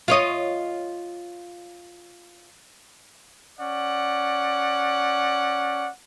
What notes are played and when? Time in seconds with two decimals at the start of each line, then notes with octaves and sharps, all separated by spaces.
0.08 F4 C#5 D#5
3.59 C#4 D5 F#5